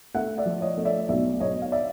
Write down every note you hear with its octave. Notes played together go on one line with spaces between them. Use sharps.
A3 E5 F#5
D5 E5
F3
C#5 D#5
A3
D5 E5
B1 D5 E5
B1 C#5 D#5
F5
D5 E5